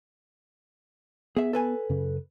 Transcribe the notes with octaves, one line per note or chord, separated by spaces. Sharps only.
B3 G#4 E5
A4 B4 G#5
F#2 C#3